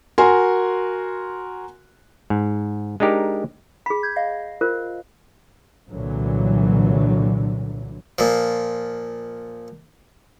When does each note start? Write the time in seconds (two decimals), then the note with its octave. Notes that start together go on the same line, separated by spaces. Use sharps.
0.18 F#4 A#4 G#5 C6
2.30 G#2
3.00 G#3 D4 D#4 G4 A#4
3.86 G#4 B5 B6
4.03 G6 G#6
4.16 D#5 F5
4.61 F4 A#4 C5
5.90 C2 A#2 D3 E3 F#3
8.19 A#2 F3